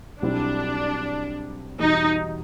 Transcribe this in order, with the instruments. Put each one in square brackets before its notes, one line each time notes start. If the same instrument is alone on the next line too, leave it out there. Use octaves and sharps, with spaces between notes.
[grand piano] B1 B2 G3 C4 E4 [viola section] D4
[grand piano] E2 B2 G3 [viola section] D#4